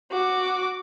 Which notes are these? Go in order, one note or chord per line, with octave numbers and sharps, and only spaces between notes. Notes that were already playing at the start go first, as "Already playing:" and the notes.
F#4 D6